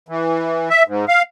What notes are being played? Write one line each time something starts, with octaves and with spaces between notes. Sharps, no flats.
E3
E5
G#2
F5